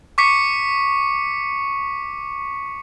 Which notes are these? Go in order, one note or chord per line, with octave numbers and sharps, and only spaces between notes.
C#6 D6 B6 C#7